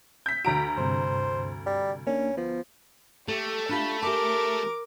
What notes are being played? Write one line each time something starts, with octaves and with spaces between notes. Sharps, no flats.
G6 B6
D2 F#4 A#5 B6 D7
G2 C3 C5
G3
A#3 C#4 D4
F3 B3
A3 G4 A4
D4 F4 G4 A5 B5
G4 A#4 G#5 A5 D6